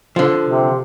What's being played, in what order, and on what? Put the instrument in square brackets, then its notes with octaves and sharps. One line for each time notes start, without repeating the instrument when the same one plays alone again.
[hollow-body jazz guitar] D3 F3
[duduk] C3